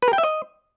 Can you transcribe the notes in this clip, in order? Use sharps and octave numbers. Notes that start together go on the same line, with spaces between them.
B4
A#4
G5
E5
D#5